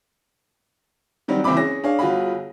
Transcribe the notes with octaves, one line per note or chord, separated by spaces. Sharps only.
D#3 F#3 G3 C4 F#4
F#1 E3 C4 E5 B5 D6
C#4 G#4 A#6
D4 G#4 C#5 F5
G1 F4 F#4 G#4 B5